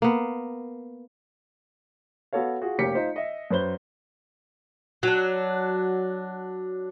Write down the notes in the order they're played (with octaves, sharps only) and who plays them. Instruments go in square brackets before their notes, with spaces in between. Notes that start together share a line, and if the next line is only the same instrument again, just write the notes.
[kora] A#3 B3
[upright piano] B3 F#4 A4 C#5 F5
F4 F#4 G#4
F1 A#3 C#4 G4 B6 C#7
D#4 F4 C5 D#5
D#5 E5
F#2 B4 C5 G7
[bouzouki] F#3 D4